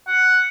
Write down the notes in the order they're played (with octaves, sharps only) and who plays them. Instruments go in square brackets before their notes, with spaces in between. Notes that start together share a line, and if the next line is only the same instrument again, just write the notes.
[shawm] F#5